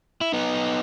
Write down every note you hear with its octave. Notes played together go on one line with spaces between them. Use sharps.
E4
B3 D#4